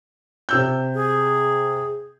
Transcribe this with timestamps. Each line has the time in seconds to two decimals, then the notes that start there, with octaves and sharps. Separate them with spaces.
0.49 C3 E6 G6
0.94 G#4